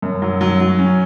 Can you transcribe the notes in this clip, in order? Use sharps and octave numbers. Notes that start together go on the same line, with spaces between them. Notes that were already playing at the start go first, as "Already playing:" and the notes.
F#2
F#3
F#3
F#3
C#4